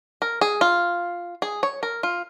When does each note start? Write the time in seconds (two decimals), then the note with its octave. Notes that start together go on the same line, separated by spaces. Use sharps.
0.22 A#4
0.41 G#4
0.61 F4
1.42 G#4
1.63 C#5
1.83 A#4
2.03 F4